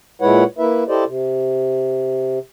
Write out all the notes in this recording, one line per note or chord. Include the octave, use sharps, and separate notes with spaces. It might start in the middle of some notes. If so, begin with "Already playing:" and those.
A#2 G#3 E4 B4 C#5 F#5
A#3 E4 B4 E5
E4 G4 A4 C5 D5 D#5
C3